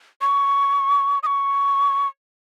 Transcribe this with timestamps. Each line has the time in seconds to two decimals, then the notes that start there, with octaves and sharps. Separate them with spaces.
0.21 C#6
1.23 D#6
1.26 C#6